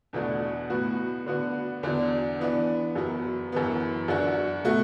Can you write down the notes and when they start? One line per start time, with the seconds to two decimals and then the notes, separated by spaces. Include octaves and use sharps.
0.13 E2 B2 A3 D4 F#4
0.70 A2 F#3 B3 F#4
1.26 D3 B3 F#4
1.83 E2 D3 F#3 D4
2.39 E3 B3 D4
2.95 F#2 F#3 B3
3.52 F#2 E3 B3
4.08 F#2 F#3 D4 F#4
4.64 B2 A3 F#4